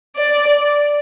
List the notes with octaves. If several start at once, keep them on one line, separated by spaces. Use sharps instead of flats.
D5